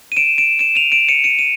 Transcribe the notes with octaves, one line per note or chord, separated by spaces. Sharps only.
D#7
D7 E7
D7 E7
D7 E7
D#7 F7
D7 E7
C#7 D#7
C#7 D#7
D#7